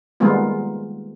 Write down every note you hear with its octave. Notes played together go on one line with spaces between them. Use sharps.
D#3 G3 G#3 A#3 B3 F4